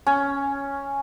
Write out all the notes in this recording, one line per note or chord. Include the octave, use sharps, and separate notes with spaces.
C#4